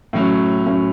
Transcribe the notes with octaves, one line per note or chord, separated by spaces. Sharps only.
A2 F#3 C#4
A2 F#3 C#4